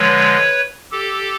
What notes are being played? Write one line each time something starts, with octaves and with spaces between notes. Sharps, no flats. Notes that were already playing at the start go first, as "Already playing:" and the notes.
Already playing: D3 F3 G#3 B4 C#5
G4 A4